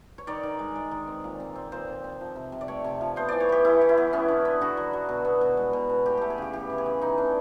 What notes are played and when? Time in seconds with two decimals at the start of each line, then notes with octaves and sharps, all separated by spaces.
0.18 C#5
0.27 D#3 D5
0.43 D#3
0.59 G#3
0.76 G#3
0.92 D#3
1.07 C4
1.24 A#2
1.40 C4
1.56 C4
1.72 A#2 C5
1.88 C4
2.04 C4
2.21 F3
2.36 C3
2.52 C3
2.61 D5
2.68 A3 C#5
2.84 C3
3.01 F3
3.16 B3 C5
3.29 E3 D5
3.40 C#5
3.49 B3 G4
3.65 E3 E4
3.81 E3
3.89 E4
3.97 B3
4.13 B3 C#4
4.28 D3
4.45 B3
4.61 D3 F#4
4.77 F#3
4.93 F#3
5.09 B2
5.25 B3
5.41 B2
5.57 G#3
5.73 B2
5.89 B2
6.05 A3 G4
6.17 A3 G4
6.30 G#4
6.38 C#3 G4
6.53 E3 G4
6.70 C#3
6.78 G#4
6.86 E3
7.02 E3 D#4
7.17 A3 D4